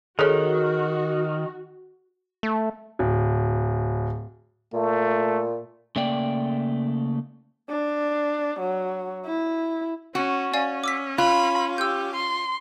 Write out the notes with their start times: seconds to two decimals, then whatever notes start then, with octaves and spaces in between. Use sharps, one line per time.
0.19 D#3 F#4 G#4 A4 C#5
2.43 A3
2.99 D1
4.74 A#2 A3
5.96 C#3 A3 A#3 D5 G5
7.69 D4
8.59 F#3
9.26 E4
10.15 C#4 F#4
10.54 C#4 D5 F5 G#5
10.84 D6 E6 B6
11.18 F4 B5 F#6
11.78 G4 E6 G6
12.15 C6